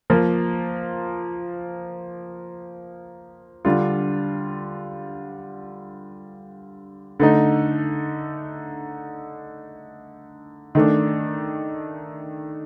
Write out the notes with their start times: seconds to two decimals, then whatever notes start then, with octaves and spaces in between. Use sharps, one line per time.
0.10 F3 A#3 F4
3.65 D3 G3 D4 F4
7.20 D3 A3 D#4
10.75 D#3 A3 D4